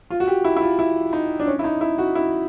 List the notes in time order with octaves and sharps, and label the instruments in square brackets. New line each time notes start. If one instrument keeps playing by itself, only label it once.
[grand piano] F4
F#4
G4
E4
E4
F4
E4
D#4
D4
C#4
E4
D#4
E4
F#4
E4